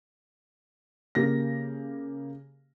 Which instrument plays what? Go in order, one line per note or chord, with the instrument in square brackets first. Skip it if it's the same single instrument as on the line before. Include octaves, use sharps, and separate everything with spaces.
[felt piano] C#3 A#3 G4 A#6